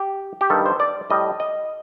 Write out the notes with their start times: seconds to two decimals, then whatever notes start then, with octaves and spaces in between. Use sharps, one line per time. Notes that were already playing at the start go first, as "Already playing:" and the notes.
Already playing: G4
0.41 G4
0.50 G2 D#3 G3 A4
0.66 C5
0.80 D5
1.10 A2 G3 D#5
1.40 D#5